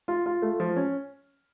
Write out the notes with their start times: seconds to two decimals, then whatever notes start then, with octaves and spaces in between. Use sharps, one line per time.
0.08 F4
0.26 F4
0.42 A3
0.60 F3
0.76 C#4